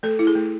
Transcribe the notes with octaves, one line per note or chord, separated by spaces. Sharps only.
A3 A4
E4
G#4
A3